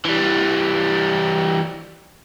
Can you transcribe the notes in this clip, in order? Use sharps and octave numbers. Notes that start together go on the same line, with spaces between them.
E3 G3